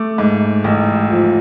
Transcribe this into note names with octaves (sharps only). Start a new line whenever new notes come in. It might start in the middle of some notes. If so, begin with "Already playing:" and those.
Already playing: A3 D6
G#2
A1
F3